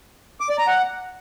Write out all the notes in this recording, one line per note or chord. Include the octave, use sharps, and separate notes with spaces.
D6
D5
A#5
F#5